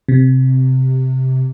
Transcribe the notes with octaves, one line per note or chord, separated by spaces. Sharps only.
C3